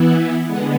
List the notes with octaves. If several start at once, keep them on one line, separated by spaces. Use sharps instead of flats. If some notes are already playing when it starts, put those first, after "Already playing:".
Already playing: E3 B3 E4
D3 G#3 B3 F#5